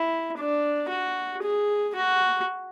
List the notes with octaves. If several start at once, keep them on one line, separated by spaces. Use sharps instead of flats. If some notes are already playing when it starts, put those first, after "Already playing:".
Already playing: E4
D4
F#4
G#4
F#4